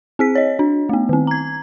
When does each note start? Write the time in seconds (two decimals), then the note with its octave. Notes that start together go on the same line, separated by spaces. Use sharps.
0.19 C4 G#4 B6
0.35 C#5 D#5
0.59 D4
0.89 A3 B3
1.09 D#3 C4
1.27 A#5 G#6